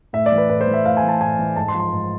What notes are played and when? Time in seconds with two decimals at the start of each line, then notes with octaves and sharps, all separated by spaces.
0.13 A2 E5
0.26 D5
0.32 E3
0.38 B4
0.49 A2 B4
0.61 C5
0.67 E3
0.74 E5
0.85 A2 F5
0.97 G#5
1.03 E3
1.08 A5
1.21 A2 G#5
1.39 E3
1.56 G#2 A5
1.68 C6
1.74 F3
1.80 C6
1.92 G#2